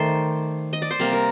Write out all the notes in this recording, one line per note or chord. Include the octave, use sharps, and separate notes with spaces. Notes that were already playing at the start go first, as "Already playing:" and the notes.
Already playing: D#3 A3 C5 D5
D#5
D5
C5
C3 G3 A#3 A#4
A#4